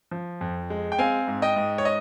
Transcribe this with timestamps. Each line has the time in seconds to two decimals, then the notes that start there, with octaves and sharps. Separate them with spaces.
0.11 F3
0.41 F2
0.70 G#3
0.92 G5
0.99 C4 F5 G#5
1.28 G#2
1.42 D#5 G5
1.56 G#2
1.78 C#5
1.85 D#5